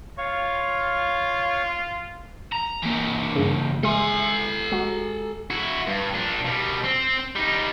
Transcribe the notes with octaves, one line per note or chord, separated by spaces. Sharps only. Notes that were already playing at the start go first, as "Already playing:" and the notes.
F4 C#5 F5 C#6
A#5
E3 A#3
G2 C#3
G#3 A4 E5 G#5 C6
G#3 F#4
E4 F#4
G2
A#2 D4
B2 G3
C4
G3 D#4